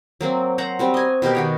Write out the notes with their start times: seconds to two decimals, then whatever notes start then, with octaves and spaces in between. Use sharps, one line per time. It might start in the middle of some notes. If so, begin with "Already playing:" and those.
0.21 F#3 A#3 C4
0.58 C5 F#5 A#5
0.79 G3 C4 F#4
0.94 D#5 G#5
1.22 B2 G4 A#4 G5
1.35 D#3 F#4 C#5